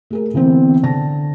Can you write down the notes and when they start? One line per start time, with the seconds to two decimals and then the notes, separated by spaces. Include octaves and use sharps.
0.11 A3 G#4 A#4
0.33 D3 E3 B3 C4
0.83 D3 A5 A#6